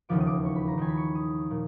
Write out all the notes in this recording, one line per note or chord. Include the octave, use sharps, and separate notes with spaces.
E1 D#2 C#3 F3 D6
D#6
D6
C#6
B5
A#5
D#2 D#3 G#5
B5
C#6
D#6
A#2 F3